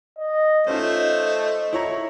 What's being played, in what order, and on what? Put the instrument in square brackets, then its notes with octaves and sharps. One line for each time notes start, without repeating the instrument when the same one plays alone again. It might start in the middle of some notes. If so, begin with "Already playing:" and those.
[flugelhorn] D#5
[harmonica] A3 C5 [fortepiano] C#4 D#4 F4 [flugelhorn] D#5
[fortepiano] E4 C#5 A#5